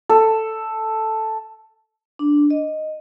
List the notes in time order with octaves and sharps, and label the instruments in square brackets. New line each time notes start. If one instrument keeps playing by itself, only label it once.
[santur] A4
[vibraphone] D4
D#5